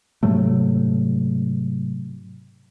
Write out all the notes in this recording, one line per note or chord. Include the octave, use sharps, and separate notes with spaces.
G#2 C3 F#3 A3